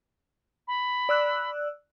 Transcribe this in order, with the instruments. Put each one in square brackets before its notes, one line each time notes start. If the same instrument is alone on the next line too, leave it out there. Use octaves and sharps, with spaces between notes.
[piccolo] B5
[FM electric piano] D5 E6 F#6